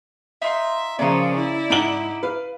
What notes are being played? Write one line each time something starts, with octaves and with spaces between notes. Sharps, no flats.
D#4 F4 E5 C6
C#3 F3 G#4 A#4 D5 C6
E4
G#2 D#4 F#5 D6 D7 F#7
B4 F5